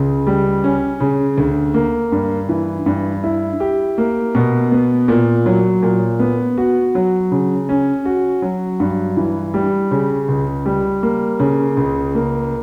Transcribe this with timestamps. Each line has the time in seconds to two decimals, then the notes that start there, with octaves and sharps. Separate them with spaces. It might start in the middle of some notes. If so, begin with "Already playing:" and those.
Already playing: C#2 C#3
0.27 G3
0.64 C#4
1.00 C#3
1.38 D2
1.74 A#3
2.12 G2
2.49 E3
2.86 G2
3.24 E4
3.60 G4
3.98 A#3
4.35 B2
4.72 B3
5.08 A#2
5.46 F#3
5.83 A#2
6.20 B3
6.58 F#4
6.95 F#3
7.32 C#3
7.69 C#4
8.05 F#4
8.42 F#3
8.80 G2
9.17 E3
9.54 G3
9.91 C#3
10.28 C#2
10.66 G3
11.03 A#3
11.40 C#3
11.77 C#2
12.15 A#3